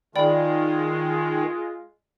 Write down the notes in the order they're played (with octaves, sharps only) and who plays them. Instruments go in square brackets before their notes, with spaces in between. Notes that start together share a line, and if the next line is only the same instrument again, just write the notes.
[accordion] D#3 [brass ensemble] G#3 F4 [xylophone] D5 G5 B5